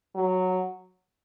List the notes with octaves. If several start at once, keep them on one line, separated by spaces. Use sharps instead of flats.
F#3